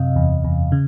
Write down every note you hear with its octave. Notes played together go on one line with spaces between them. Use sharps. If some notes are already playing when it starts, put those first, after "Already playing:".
Already playing: F#2 C3 D#5 F5
E2
E2
C#3